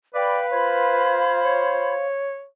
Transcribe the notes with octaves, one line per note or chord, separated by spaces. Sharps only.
B4 D5 F5 G5 B5
F4 C5 B5 G#6
C#5